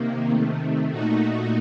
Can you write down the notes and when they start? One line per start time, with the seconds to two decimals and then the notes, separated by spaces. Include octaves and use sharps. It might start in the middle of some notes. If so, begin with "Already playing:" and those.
Already playing: C3 D#3 A#3
0.30 C3 D#3 A3
0.90 A#2 A3 D#4 F#4